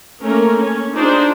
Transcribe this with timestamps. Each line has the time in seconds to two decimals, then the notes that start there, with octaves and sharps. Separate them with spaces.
0.22 A3 A#3 C#4 A#4
0.60 C#4
0.95 D4 D#4 F4 G#4 C5 D5